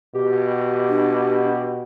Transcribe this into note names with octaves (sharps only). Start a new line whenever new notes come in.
B2 G4
D4